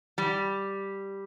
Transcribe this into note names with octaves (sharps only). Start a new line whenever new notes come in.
G3